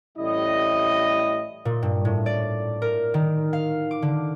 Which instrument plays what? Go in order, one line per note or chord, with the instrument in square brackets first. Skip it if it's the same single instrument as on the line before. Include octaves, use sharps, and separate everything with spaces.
[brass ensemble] A1 A2 G3 E4 D#5
[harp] A#2
G2
A2
D5
A#4
D#3
F5
D6
D3